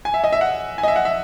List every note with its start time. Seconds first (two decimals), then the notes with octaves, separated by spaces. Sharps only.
0.05 G#5
0.14 E5
0.24 D#5
0.32 E5
0.41 F#5
0.78 G#5
0.83 D#5
0.88 E5
0.96 F#5
1.05 E5